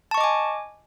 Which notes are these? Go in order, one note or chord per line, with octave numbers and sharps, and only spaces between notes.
D#5 G#5 A5 C#6 D6